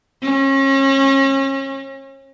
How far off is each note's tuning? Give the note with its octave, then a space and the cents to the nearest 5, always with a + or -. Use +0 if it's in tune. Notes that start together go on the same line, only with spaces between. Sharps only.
C#4 -35